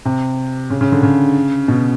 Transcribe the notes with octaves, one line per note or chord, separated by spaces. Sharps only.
C3
C#3
C#3
D3
C#3
B2